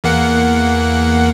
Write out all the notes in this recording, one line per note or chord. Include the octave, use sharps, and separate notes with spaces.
E2 A#3 F#5